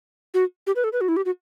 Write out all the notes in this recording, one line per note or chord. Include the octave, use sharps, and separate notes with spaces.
F#4
G4
B4
A4
B4
F#4
E4
G4
F#4